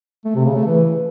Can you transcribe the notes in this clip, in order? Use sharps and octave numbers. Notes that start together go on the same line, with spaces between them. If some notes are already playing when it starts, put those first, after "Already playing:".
A3
C3
C#3
A3
E3